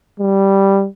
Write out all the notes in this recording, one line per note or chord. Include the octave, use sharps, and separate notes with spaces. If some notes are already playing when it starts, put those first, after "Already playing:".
G3